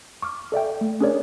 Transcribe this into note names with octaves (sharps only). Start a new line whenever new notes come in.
C#6 D6 F6
A4 D5 E5 G5
A3
C#4 D4 G#4 A#4 C#5 D5